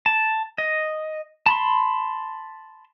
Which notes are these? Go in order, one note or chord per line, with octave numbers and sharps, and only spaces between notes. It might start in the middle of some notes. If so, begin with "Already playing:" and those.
A5
D#5
A5 B5 C6